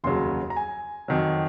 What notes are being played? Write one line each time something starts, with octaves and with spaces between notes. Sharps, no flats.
F1 D#2 C#3 F#3 C6
A#5
G#5
F2 D#3 F#3